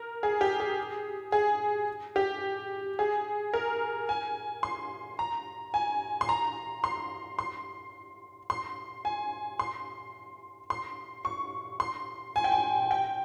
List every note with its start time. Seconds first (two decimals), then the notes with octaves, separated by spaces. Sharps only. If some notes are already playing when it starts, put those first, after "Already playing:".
Already playing: A#4
0.23 G#4
0.41 G4
0.60 G#4
1.32 G#4
2.16 G4
2.99 G#4
3.54 A#4
4.09 G#5
4.63 C6
5.19 A#5
5.74 G#5
6.21 C6
6.29 A#5
6.84 C6
7.39 C6
8.50 C6
9.05 G#5
9.59 C6
10.70 C6
11.25 C#6
11.80 C6
12.36 G#5
12.44 G5
12.52 G#5
12.91 G5